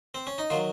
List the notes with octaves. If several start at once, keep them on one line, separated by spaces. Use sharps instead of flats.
C4
C#4
D#4
D#3 F#3 F4